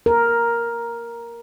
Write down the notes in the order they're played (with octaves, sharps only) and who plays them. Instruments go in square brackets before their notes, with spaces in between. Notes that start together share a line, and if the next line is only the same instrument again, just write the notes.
[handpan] A#4